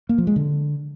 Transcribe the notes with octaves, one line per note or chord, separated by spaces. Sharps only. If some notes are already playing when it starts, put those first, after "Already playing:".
A#3
F3
G#3
D3